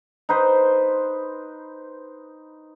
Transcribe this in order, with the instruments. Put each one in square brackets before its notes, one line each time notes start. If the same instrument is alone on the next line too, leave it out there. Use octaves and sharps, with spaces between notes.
[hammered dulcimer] D#4 B4 C5